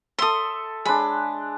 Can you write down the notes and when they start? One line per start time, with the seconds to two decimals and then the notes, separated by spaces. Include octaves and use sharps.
0.19 A4 E5 C6 D#6
0.85 G#3 D4 B5